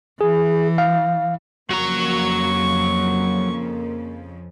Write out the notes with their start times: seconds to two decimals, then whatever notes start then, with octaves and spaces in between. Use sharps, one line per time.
0.21 E3 G#4
0.78 F5
1.70 F2 C#3 F3 F#3 A#3 A#5 C#6